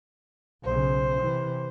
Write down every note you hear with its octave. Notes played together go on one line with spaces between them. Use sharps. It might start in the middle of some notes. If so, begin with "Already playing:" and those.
B1 C#3 C5
C3 E3